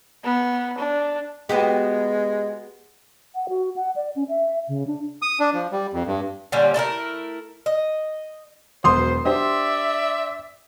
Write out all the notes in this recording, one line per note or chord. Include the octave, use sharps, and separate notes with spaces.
B3
D4
G#3 B3 F#4 G4
F#5
F#4
F#5
D5
C#4
E5
C#3
D4
D#6
D4
F3
G3
F2
G2
A#2 D3 G3 C#4
A3 E4 A4 A#4
D#5
E1 F#3 B3 C5 C6 D#6
D4 G4 C5 D5 E5